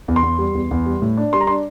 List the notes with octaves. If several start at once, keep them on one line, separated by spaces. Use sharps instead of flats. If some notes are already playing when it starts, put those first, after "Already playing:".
E2
C6
E2
G3
E2
E2
G3
A2
D4
G3 C6
A#5
D4 C6